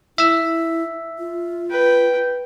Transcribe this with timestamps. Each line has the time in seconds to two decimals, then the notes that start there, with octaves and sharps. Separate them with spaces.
0.18 E4 E5 E6
1.19 F4
1.70 B4 G5